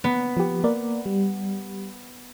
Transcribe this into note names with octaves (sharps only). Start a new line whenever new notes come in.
B3
F3 G4
A#3 A#4 D5
G3